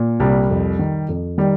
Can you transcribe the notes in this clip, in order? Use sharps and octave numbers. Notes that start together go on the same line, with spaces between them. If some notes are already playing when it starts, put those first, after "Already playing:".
Already playing: A#2
C2 G3
F2
D#3
F2
D#3 G3